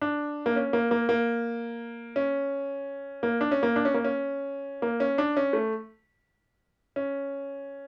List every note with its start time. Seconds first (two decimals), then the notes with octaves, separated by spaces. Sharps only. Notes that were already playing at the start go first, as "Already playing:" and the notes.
0.01 D4
0.46 A#3
0.56 C#4
0.73 A#3
0.91 A#3
1.09 A#3
2.16 C#4
3.23 A#3
3.41 D4
3.51 C#4
3.63 A#3
3.76 D4
3.85 C#4
3.94 A#3
4.04 C#4
4.82 A#3
5.00 C#4
5.18 D4
5.37 C#4
5.53 A3
6.96 C#4